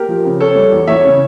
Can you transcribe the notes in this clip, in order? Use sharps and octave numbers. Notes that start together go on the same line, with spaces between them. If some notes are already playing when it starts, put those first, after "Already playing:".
Already playing: G4 A#4
F3
C#3
C#3 A4 C#5
G3
E2
E2 C#5 E5
C#3